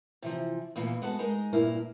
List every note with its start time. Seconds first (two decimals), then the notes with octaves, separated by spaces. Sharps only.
0.22 C3 E3 F3
0.76 E2 A#2 E3 A#3
1.02 G#3 B3 F#4 A4
1.19 G#3 D#4 A#4
1.53 G2 A#2 A#3 E4